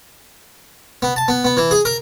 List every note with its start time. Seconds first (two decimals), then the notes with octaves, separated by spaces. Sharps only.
1.02 B3
1.16 A5
1.28 B3
1.44 B3
1.57 E3
1.71 G#4
1.85 A#4